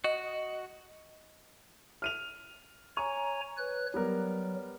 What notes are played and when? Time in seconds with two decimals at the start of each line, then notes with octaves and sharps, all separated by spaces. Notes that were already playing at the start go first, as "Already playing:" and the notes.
0.04 F#4 D#5
2.02 F6 D#7 F7
2.97 C#5 G#5 A#5 C#6
3.57 B4 C#5 F#6
3.94 F#3 G3 B3 A#4